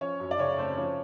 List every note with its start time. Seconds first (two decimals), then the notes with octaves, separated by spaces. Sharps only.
0.01 F3 C#4 C#5
0.20 F#2
0.31 D5
0.39 C#3 C#4 C#5
0.58 A3 C4 C5
0.77 F3 C#4 C#5